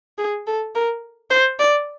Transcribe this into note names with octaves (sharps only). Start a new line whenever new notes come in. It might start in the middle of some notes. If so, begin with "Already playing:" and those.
G#4
A4
A#4
C5
D5